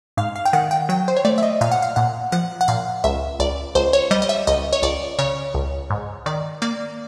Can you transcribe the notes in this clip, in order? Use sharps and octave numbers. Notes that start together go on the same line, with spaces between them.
G#2 F5
F5
G5
D#3 F#5
G5
F#3 G5
C5
C#5
A3 D5
E5
D#5
A#2 F5
F#5
F5
A#2 F#5
F3 F#5
F#5
A#2 F5
C#2 E5
C#2 D5
C#2 C5
C#5
G3 D#5
D#5
E5
C#2 D#5
C#5
C#2 D5
C#3 C#5
C#2
G#2
D#3 D5
A#3 D5